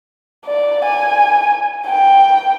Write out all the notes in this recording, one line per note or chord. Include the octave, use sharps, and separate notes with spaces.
D5
G#5
G5